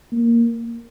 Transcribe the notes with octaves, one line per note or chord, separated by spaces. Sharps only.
A#3